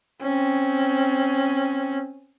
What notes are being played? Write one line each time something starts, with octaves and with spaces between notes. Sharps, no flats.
C4 C#4